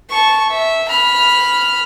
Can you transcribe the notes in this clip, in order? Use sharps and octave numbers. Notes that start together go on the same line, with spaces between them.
A5 C#6
E5
B5 F6